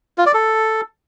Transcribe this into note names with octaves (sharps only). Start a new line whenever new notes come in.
F4
D5
A4